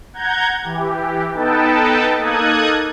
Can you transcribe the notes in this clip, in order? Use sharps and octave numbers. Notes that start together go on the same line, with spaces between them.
F#5 A#5 G6 G#6
E3 G4
B3 D#4 A4 B4 G5 A5
A#3 D#4 A4 D#6 F#6 G#6